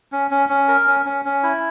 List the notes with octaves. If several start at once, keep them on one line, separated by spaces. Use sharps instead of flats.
C#4
C#4
C#4
A#4
C#4
C#4
C#4
E4